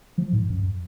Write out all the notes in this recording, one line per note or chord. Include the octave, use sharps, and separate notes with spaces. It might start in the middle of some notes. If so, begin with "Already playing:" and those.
F3
G#2
F#2